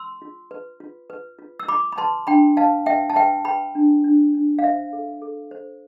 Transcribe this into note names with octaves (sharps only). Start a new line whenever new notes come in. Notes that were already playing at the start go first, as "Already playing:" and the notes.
Already playing: C6 E6
F4
B4
F4
B4
F4
E6
F4 B5 D6
B5
B4 A5 C6
D4 G5 B5
B4 F5 A5
B4 E5 G5
A5
B4 E5 G5
B4 G5 B5
D4
D4
D4
F5
C5 E5
A4
A4
C5